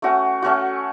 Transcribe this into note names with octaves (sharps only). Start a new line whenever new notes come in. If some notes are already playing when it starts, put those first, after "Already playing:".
A3 C#4 F#4
A3 C#4 F#4